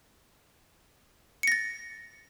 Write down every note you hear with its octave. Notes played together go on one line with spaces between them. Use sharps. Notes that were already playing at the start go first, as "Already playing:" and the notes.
A6 A#6 C#7